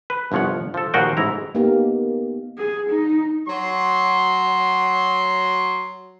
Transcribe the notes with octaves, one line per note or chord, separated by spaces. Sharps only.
B4
G1 C2 F3 C#5 F#5
F3 A4
D#2 A#2 F3 F#4 F5 G5
A1 G#2 E4 A#5
A#3 B3 D#4 G4 A#4
G#4
D#4
F#3 C6